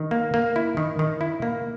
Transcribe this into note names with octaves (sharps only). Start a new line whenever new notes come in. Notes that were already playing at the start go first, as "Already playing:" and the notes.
Already playing: D#3
A#3
A#3
E4
D#3
D#3
E4
A#3